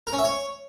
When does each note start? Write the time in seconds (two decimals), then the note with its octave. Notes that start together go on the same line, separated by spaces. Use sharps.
0.07 A#4
0.13 C#4
0.18 E5
0.24 C#5